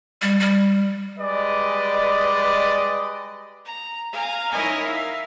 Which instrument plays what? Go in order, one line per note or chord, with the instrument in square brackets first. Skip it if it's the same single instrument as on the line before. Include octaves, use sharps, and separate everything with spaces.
[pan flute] G3
G3
[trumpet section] G3 G#3 B4 D5 D#5
[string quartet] A#5
F5 G#5 A#5
D#4 E4 A#4 C#5 D#5 G#5
E5 F5